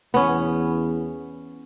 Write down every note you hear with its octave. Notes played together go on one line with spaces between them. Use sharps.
E2 B3 C#4